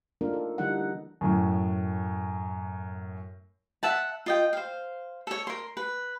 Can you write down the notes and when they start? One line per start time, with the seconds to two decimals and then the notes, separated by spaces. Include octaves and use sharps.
0.21 A3 A#3 D4 D#4 F4 A#4
0.33 A4
0.58 D3 E3 G3 A3 D#4 F#5
1.21 F#2 A2
3.83 E5 F#5 A5
4.26 F4 D#5 G5
4.53 C5 F5
5.27 A4 C#5
5.47 A#4 C6
5.77 B4